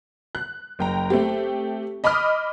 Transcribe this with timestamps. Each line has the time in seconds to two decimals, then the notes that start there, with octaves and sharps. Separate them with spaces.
0.35 F#6
0.79 F#1 G5 A#5
1.10 A3 C4 G4
2.04 D#5 B5 D6 D#6 F6